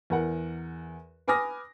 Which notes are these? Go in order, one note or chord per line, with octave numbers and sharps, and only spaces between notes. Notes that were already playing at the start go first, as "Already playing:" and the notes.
E2 A#4 F#5
B4 G#5 D6 D#6 F6 A#6